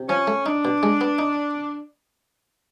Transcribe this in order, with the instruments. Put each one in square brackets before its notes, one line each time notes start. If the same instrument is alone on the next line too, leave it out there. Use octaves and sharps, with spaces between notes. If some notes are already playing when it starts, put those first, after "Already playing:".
Already playing: [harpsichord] C3
[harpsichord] F3 [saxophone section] C#4
[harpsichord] A3
[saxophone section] D4 [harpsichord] D#4
[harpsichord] B2
G#3
B3
D#4